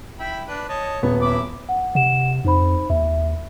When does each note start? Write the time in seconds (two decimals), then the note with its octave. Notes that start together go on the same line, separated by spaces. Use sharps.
0.20 E4 G5 B5
0.48 D4 B4
0.69 C#5 D#5 A5
1.03 D#1 B3 C#5
1.22 E4 B5 D6
1.69 F#5
1.95 C3 F#5 E7
2.45 F2 D#4 C5 B5
2.90 D#2 E5